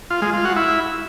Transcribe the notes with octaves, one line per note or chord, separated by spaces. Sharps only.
F4
G#3
F4
F#4
E4